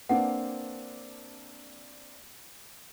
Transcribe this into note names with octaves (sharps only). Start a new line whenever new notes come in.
A#3 C4 D4 B4 F#5